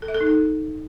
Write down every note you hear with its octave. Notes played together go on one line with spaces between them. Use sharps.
A4
E5
A4
D#4
A4